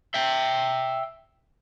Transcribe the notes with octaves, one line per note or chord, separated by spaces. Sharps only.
E5 G5